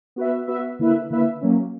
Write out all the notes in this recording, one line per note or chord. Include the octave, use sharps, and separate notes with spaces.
B3 F#4 B4 E5
B3 F#4 B4 E5
D3 A#3 E4 B4 E5
D3 A#3 E4 B4 E5
F#3 A#3 C#4